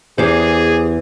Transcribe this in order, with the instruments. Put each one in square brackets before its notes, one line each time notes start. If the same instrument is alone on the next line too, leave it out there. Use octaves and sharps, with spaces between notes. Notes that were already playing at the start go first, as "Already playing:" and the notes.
[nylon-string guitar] E2 E3 [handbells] G4 C5 [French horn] G#4